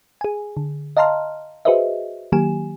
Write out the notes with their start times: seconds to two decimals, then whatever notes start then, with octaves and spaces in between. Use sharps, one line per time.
0.21 G#4 G#5
0.57 D3
0.97 D#5 F5 A5 A#5 C6 F6
1.65 F#4 G#4 B4 C5 D#5 E5
2.32 D#3 F#3 A#3 G4 G#5 E7